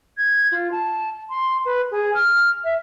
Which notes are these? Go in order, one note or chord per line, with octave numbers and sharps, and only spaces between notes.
G#6
F4
A5
C6
B4
G#4
F6
E5